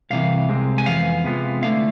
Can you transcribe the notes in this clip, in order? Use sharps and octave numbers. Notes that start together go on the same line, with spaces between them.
C2 C3 E3 F5
C2 C3 G#3 C4
G#5
F2 E3 B3 F5
C3 G#3 B3 F4
D3 A3 E4 F5